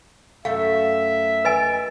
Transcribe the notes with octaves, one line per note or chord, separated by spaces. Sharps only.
F#2 A3 E5 F5
B4 D#5 G#5